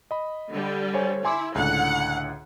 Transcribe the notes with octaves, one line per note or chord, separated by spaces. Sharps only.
D#5 B5
D3 G3
C5 C#5 G#5
E4 G#5 C6 D6
C#2 A2 D3 F#5